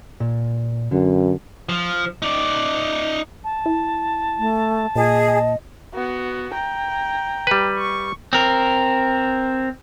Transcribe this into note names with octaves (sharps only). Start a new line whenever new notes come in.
A#2
F#2 D3
F3
D#4 D5
A5
E4
A3
A#2 G#4 D#5
B3 F#4
G5 A#5
G3 B4
C#6
C4 A#4